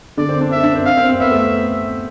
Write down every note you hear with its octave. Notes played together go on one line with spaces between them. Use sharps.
D3 D5
C4
D4
C4 E5
D4
C4
F5
C4
C4
B3 E5
A3